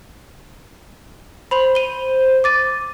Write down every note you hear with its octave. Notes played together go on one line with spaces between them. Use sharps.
C5 B5 F7 F#7
D#7 G7
D6 A6 D#7